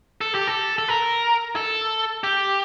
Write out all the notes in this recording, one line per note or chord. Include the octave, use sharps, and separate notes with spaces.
A4
G4
A4
A4
A#4
A4
G4